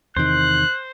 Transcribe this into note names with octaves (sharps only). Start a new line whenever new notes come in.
E2 C3 D#3 C5 F#6